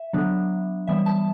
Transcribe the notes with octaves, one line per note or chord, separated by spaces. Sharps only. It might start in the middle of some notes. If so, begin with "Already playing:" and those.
Already playing: E5
D3 F#3 B3 D4
E3 G3 B3 E5
A5